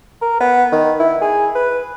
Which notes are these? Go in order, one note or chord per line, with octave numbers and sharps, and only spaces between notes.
A#4
B3
D#3
E4
G#4
B4